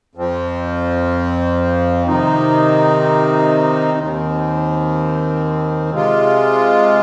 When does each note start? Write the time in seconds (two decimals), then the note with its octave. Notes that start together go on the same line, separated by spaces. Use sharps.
0.15 F2 F3 C4
2.07 C3 D#3 C4 D#4
3.99 D#2 D#3 C4
5.91 C3 G#3 F4